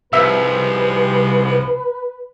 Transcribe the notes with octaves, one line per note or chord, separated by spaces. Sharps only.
C2 G#2 C3 F3 B4 E5